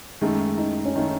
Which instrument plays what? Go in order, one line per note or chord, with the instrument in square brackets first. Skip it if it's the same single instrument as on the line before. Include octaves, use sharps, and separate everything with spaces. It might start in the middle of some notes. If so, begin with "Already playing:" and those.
[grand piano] F#2 D#3 A3 [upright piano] G#3
[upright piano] D#4
C#4
[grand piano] D#3 A3 [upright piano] D#4